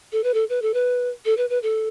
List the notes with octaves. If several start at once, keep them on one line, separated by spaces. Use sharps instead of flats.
A4
B4
A4
B4
A4
B4
A4
B4
B4
A4